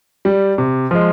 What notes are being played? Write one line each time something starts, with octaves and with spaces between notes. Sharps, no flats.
G3
C3
F3 G#3